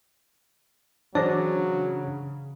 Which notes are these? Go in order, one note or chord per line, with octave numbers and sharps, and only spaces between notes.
C#3 E3 F#3 D4 G#4 C5